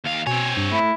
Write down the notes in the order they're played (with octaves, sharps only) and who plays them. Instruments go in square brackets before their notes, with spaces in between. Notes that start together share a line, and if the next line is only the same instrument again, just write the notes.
[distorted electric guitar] D#2 F5
[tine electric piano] B2 G#5 [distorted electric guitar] C4 C#5
[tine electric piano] G2
[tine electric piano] A3 [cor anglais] E4